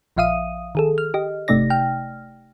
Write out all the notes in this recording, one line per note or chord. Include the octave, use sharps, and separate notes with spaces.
A#1 F3 E5 F5 D#6 D#7
D#3 G#4 A4
F6
G4 D#5
G1 C3 A3 D#4 D5 A#6
G5 F6